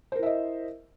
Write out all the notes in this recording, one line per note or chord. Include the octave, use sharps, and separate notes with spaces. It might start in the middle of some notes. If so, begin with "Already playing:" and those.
E4 A#4 C5 D#5 E5